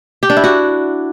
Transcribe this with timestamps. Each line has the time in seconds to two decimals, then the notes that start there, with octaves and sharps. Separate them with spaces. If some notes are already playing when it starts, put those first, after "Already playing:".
0.23 G4
0.30 D4
0.37 E4
0.44 F#4